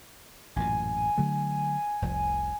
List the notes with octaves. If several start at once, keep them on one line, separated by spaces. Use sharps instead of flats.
A1 F#2 A#2 G#5
D3 F#3 A3
F1 C2 F3